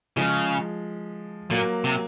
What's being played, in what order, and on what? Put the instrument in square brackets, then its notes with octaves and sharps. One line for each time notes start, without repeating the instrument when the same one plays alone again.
[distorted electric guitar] C#3 [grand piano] F3 G#3
[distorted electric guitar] A#2 [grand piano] F#3 A#3
[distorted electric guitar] C3